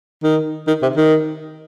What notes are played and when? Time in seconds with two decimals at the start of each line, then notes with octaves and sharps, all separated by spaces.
0.24 D#3
0.68 D#3
0.82 C3
0.97 D#3